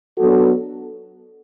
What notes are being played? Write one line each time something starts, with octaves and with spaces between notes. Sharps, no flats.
F#3 B3 D4 F#4 A4